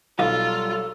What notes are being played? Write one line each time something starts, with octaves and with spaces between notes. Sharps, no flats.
B1 G3 F4 A4 D#5 F5